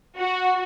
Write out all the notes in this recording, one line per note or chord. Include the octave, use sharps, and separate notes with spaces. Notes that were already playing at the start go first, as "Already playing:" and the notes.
F#4